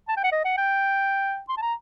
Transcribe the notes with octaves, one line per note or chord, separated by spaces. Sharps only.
A5
G5
F#5
D#5
F#5
G5
C6
A5
A#5